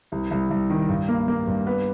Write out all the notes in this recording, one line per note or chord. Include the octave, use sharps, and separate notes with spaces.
C2
C2
C2
D#3
G2
A#3
A#3
G2
B3